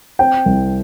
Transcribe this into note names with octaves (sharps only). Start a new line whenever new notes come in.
C4 G5
C2